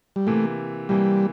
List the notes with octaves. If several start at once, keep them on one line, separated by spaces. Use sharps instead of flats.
G3
C3 E3 A3 A#3
C3 E3 G3 A#3